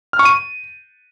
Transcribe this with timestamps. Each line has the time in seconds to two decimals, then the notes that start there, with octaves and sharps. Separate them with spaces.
0.13 F6
0.19 C#6
0.25 D#7